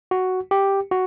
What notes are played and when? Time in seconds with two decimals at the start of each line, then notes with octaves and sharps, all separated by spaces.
0.11 F#4
0.51 G4
0.91 F#4